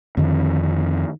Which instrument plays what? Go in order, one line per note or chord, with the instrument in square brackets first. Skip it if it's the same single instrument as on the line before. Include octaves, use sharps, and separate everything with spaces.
[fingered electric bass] F2 D3 D#3 C4